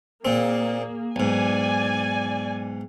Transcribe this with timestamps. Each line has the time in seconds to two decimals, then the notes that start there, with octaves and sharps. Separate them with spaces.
0.25 A#2 A#3 C4 G#4
1.16 B1 G#2 D5 G#5